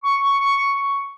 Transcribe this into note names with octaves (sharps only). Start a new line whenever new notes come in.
C#6